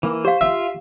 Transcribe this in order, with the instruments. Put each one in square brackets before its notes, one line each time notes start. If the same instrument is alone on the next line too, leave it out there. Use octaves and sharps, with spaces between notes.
[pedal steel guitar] E3 A#3
[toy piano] G4 F5 [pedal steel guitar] C5
[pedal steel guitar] F4 [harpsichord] E5